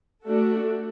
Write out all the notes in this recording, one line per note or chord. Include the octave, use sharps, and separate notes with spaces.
A3 D4 F#4 A4